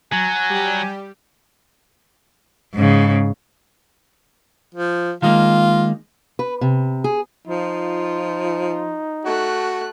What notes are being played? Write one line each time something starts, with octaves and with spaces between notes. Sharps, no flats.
F#3 G#5
G3 G4
G#2 C#3
F3
D#3 G#3 A#3 F4
B4
C3
G#4
F3 D#4 F4
A3 F#4 F#6